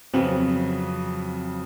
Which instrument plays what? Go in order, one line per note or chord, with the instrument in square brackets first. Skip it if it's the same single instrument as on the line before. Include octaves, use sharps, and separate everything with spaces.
[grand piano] F2 C#3 F#3 B3 [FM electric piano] C4